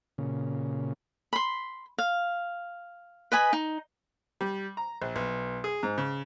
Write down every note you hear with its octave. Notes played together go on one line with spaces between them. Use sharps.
A#2 C#3
B5 C6
F5
B4 D#5 G#5 B5
D#4
G3
A#5
A#1
B1
G#4
G#2
C#3